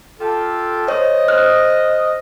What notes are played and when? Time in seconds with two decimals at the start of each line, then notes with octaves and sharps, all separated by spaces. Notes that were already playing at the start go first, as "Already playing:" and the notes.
0.20 F4 G4 A4
0.88 C5 C#5 D#5
1.28 C5 F6 F#6